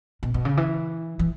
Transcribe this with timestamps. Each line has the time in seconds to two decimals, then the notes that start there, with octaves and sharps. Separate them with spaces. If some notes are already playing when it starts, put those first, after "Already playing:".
0.23 B2
0.34 B2
0.45 C#3
0.57 E3
1.19 E3